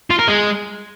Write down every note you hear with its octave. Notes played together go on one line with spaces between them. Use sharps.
F4
A#4
G#3